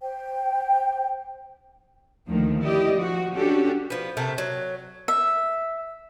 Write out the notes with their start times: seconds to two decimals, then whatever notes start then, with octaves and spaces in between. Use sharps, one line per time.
0.01 C5 G5
2.27 D2 D#3 F3 A#3
2.62 E4 G4 D5 D#5
2.97 F3 F#4
3.34 C#4 D4 F#4 G4 A4
3.90 F3 B3
4.17 C3 A3 A#4
4.38 F#3
5.08 E5